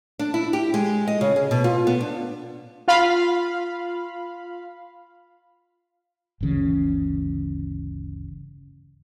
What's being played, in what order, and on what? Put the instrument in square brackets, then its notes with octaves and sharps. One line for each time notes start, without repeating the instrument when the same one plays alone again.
[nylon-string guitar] D4
E4
G4
G#3
D#5
C#3
G#4
B2
F4
B3
D4
[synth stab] F4 F5 B5
[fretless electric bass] G1 D2 C#3 E3